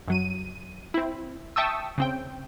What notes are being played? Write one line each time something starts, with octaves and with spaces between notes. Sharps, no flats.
F#2 F#3 D#7
C4 E4
E5 G5 A5 C#6 D#6 E6
C#3 C4 G5